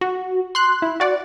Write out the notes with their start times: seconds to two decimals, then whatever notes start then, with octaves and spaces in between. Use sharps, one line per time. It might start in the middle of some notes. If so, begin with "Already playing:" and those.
0.01 F#4
0.55 C6 F#6
0.82 E4
1.00 F#4 D5 F#5